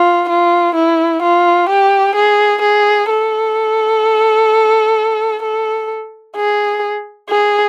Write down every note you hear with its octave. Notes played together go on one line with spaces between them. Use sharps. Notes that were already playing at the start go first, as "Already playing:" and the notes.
Already playing: F4
F4
E4
F4
G4
G#4
G#4
A4
A4
G#4
G#4